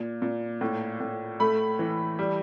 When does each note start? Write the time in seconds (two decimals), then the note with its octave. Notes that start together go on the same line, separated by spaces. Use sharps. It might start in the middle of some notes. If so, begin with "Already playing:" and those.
Already playing: A#2
0.22 A#2
0.61 A2
1.00 A2
1.40 A3 B5
1.79 E3
2.19 G3